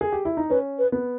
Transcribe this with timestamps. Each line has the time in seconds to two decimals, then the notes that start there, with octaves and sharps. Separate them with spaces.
0.01 G#4
0.12 G4
0.25 E4
0.37 D#4
0.50 C#4 B4
0.78 B4
0.92 B3